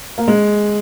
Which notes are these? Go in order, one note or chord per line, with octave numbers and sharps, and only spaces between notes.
A#3
G#3